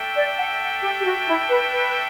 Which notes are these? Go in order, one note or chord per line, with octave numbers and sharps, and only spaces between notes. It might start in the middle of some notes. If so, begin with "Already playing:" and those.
Already playing: A3 D4 A4 E5 G5
D5
F#5
F#5
G4
G4
F#4
E4
B4
B4